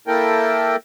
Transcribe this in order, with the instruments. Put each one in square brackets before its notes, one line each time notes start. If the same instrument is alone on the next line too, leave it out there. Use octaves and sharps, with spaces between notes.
[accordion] A#3 E4 A4 A#4 G5